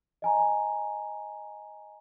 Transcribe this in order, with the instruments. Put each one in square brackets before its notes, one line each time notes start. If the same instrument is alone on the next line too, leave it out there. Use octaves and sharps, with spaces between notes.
[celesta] D#5 G#5 A#5